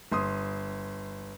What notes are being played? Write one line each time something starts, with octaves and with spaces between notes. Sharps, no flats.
G1 C6 D#6